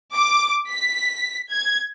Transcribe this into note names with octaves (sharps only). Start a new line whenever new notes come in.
D6
B6
G#6